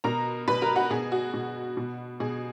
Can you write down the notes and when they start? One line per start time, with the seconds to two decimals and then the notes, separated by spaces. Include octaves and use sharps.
0.04 B2 A#4 A#5
0.48 B2 B4 B5
0.62 A#4 A#5
0.76 F#4 F#5
0.90 B2 G#4
1.12 F#4
1.34 B2
1.77 B2
2.20 B2 G#4